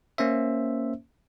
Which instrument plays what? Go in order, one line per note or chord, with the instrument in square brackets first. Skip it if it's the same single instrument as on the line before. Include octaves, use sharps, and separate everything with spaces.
[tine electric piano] A#3 C#4 C5 E5